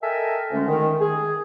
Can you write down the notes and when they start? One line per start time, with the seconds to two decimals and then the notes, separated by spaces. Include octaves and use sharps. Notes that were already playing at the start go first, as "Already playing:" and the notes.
0.02 A4 A#4 D#5 E5 G5 G#5
0.52 D2 D3 G#3 A3 C#4
0.68 D#3
1.01 G#4